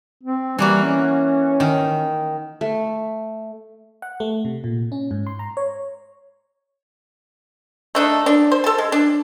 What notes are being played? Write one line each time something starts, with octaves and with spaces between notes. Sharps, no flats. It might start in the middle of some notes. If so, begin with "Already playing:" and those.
C4
E3 G3 A#3 F#4
C#4
D#3
A3
F#5
A3
C3
A#2
C#4
G#2
C6
A#5
C#5
A3 D4 D#4
D4
C5
A4 A5
G#3
D4